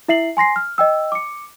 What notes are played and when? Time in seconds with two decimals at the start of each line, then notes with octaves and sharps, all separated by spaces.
0.08 E4 E5 C7 F#7
0.37 G#5 C6 A#6 C7
0.56 F6
0.78 D#5 G5 E6
1.12 D6 C#7